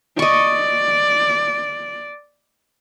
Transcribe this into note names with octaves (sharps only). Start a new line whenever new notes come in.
D5 D#5 C#6